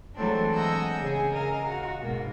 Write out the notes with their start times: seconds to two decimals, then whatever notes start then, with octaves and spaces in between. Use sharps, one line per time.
0.16 E3 F#3 G#3 A3 C4 D4
0.53 D#5 F#5 G#5 E6 G6
1.00 C#3 G#4 G#5
1.33 A#4 D#5 F5
1.66 F#4
2.01 G#2 B2 A#3